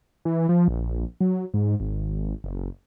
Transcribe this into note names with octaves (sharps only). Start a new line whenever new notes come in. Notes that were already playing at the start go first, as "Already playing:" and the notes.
E3
F3
A#1
F#3
G#2
G#1
F#1